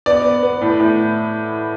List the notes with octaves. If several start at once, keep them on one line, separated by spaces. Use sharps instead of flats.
B3 D5
B3
B3
A2
A2